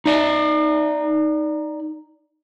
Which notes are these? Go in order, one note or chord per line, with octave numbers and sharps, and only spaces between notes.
D#4 D5